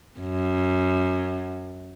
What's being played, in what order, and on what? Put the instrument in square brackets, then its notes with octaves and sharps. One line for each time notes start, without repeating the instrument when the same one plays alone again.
[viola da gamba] F#2